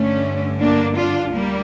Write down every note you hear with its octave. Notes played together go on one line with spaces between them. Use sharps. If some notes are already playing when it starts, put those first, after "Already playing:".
Already playing: G2 D3 A3 C#4
A#3 D4
D4 F4
D2 G3 A#3